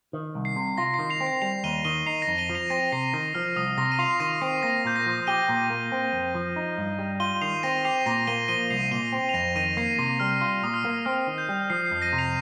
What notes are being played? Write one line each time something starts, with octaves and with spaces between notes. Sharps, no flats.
D#3
C2
C7
C3
F4 A#6
C7
D#3
C7 F7
C4
C7
G3 C7 F7
D#2 D#7 G7
D#3 D#7 G7
D#4 C7 F7
A#6 D#7
F2
D#7 G7
F3
C7 F7
C4 A#6 D#7
C3 C7
D#3 A#6
F3 F6
C2 D#6
C3 A#6
D#7
F4 C7 F7
D#3 A#6 D#7
C4 C7
A#3 A#6
A#2 G6
A#6
F3
G4 D#7 G7
A#2
A#3
C4
F2
F3
D#4
G2
G3
F4 D#7 G7
D#3 C7 F7
C4 A#6 D#7
G4 C7 F7
A#2 A#6 D#7
A#3 D#7 G7
F3 D#7 G7
C2 C7 F7
A#2 D#7 G7
C4
F7
F2 A#6 D#7
D#3 A#6 D#7
A#3 C7
C3 A#6
G3 F6
F4
A#2 D#6
F6
A#3
C4 F6
D#3
G6
G3
F3 C7
C7
F2
A#6 D#7
C3
C7 F7